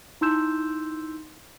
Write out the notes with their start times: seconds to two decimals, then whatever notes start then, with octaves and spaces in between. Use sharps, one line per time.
0.21 D#4 E4 C6 E6 G6 E7